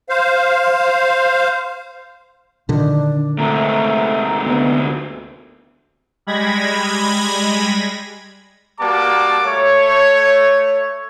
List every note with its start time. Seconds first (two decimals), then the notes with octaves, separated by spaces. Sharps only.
0.09 C5 F5
2.69 A#2 D3 D#3 D4
3.38 G#2 C3 A3 A#5
4.45 D2 B3
6.27 G3 G#3 B5 G#6 A#6
8.80 G3 A#3 F#4 A5 D6
9.46 A3 C#5